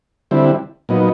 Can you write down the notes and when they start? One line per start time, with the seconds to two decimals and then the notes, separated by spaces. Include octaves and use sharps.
0.31 D3 G3 C4 E4
0.89 A#2 F#3 B3 D#4